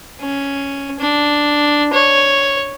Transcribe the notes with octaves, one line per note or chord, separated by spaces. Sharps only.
C#4
D4
C#5